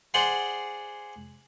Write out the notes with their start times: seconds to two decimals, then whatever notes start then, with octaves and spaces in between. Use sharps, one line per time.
0.14 G#4 C5 D5 F#5 C6